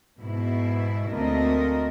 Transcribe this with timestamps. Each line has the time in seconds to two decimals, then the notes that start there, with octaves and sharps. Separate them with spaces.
0.19 G#2 B2 E4
1.10 D2 A3 A#3 C4 A#4 D#5